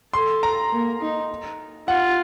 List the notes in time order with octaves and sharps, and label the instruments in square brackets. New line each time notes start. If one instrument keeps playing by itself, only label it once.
[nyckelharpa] A4 [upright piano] C6
[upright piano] A#5
[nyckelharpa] A#3
D#4
[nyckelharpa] F4 [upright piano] F#5